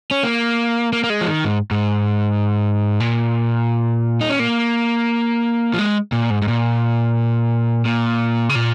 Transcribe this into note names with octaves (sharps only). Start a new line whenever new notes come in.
C#4
A#3
A#3
A#3
G#3
F3
D#3
G#2
G#2
A#2
D#4
C#4
A#3
F3
G#3
A#2
G#2
G#2
A#2
A#2
C#3
A#2